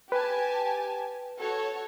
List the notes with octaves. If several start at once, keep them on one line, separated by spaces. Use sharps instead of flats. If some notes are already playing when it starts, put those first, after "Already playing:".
G4 B4 G#5 A5
F#4 A4 C#5